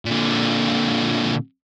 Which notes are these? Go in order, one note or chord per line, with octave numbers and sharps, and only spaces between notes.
A#2 D3